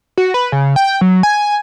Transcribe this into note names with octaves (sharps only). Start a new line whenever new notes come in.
F#4
B4
C#3
G5
F#3
G#5